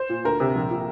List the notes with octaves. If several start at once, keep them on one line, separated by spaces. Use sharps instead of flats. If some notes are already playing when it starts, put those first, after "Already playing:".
Already playing: C5
A#2
D2 A#4
C3
A#1
A#2